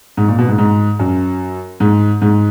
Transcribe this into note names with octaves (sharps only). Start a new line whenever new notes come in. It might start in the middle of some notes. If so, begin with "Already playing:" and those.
G#2
A#2
B2
G#2
G#2
F#2
G#2
G#2